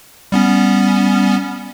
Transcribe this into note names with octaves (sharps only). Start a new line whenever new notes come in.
G3 B3 C#4